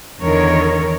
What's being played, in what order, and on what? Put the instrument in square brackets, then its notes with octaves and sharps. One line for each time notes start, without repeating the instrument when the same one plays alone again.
[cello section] E2 D3 D#3 A#4 C#5